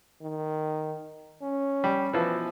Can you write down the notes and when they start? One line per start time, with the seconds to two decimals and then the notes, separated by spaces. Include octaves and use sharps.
0.22 D#3
1.42 C#4
1.84 G3
2.13 B2 E3 F3